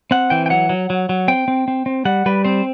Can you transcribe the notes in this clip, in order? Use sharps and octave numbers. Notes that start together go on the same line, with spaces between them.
C4 F#5
E3 G5
G5
F#3 F#5
F#3
F#3
F#3
C4 G5
C4
C4
C4
G3 F#5
G3 B4
C4 C5